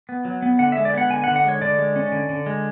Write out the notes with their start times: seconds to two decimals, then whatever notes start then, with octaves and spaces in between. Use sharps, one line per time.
0.09 B3
0.25 F#3
0.42 B3
0.59 D3 F#5
0.72 G#3 E5
0.85 D5
0.94 B3 F#5
1.10 D3 G#5
1.24 F#5
1.28 D3
1.36 F#5
1.44 G#3 C#5
1.61 D3 D5
1.79 G#3
1.96 C#4
2.12 D3
2.29 D3
2.46 G#3